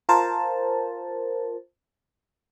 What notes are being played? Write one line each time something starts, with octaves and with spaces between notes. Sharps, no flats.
F4 A#4 C5 A5